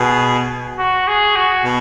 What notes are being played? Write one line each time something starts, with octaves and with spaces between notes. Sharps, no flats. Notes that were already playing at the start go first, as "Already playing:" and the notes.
Already playing: B2 G#4
F#4
G#4
F#4
B2